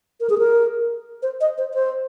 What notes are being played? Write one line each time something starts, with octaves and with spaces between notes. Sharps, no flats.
A#4
G#4
A#4
C5
D#5
C5
C5